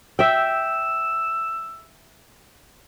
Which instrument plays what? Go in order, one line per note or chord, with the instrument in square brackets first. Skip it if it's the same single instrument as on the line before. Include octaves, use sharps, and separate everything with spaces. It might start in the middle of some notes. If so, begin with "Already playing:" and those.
[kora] E5 G5 [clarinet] E6